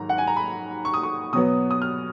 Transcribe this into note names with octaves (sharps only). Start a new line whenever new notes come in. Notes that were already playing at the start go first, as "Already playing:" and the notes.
Already playing: G#2 D#3 F#3 A#5
F#5
G#5
A#5
B5
C#6
D#6
C#6
B2 F#3 B3 D#6
D#6
F6